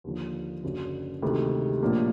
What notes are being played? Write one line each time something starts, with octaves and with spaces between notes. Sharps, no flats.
D#2 D3 F3
F#1 F#2 D3
D2 C3 D#3 G#3
A#1 A2 F3 A#3 D4